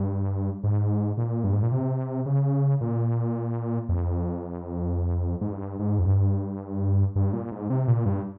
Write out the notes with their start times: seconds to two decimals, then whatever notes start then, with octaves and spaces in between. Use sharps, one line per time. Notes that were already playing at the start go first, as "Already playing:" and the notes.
Already playing: G2
0.64 G#2
1.17 A#2
1.44 G2
1.53 G#2
1.63 A#2
1.72 C3
2.26 C#3
2.81 A#2
3.89 F2
5.41 G#2
5.52 G2
5.79 G#2
5.99 F2
6.06 G2
7.16 G2
7.33 A#2
7.52 G#2
7.70 C3
7.88 A#2
8.06 G2